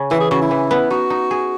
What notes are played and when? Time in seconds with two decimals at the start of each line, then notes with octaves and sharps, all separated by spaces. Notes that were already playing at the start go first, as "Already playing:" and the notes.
Already playing: C#3 C#4
0.11 E3 E4
0.20 G#4
0.31 C#3 F#4
0.41 E4
0.51 E3
0.71 B3
0.91 D#4 F#4
1.10 D#4
1.31 G#4